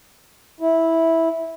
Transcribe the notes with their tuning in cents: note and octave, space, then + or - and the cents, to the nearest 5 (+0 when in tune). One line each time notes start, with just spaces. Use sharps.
E4 -10